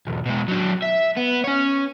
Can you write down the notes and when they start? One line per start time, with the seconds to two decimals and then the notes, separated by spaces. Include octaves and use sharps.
0.07 B1 E2
0.26 B2 G#3
0.48 F#3 D4
0.83 E5
1.17 B3
1.44 C#4 C#5